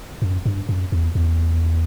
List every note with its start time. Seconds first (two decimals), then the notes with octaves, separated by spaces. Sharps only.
0.22 F#2
0.46 G2
0.69 F#2
0.92 E2
1.15 E2